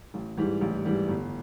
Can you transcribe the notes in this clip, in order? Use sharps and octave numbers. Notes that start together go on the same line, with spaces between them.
A1
G#2 E3 G3
A1
G#2 E3 G3
G1